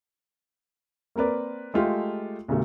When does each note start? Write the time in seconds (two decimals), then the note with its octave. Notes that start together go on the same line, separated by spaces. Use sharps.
1.16 A#3 C4 A#4 B4 D5
1.74 G#3 A3 F4 G4
2.48 B1 F#2 D3 G3 A3